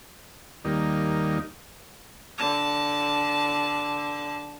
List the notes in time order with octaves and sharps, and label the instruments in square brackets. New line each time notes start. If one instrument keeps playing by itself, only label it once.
[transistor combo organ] D#2 G3 A#3 D#4
[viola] D3 A5